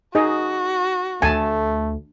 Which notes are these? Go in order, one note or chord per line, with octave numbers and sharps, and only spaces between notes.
D#4 F#4 G#4 D#5
D2 A3 G#5 A5